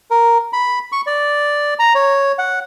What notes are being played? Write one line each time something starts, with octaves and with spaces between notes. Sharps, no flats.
A#4
B5
C#6
D5
A#5
C#5
F#5